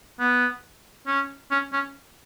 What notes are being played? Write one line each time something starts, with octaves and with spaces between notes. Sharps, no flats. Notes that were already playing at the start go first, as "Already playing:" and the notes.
B3
C#4
C#4
C#4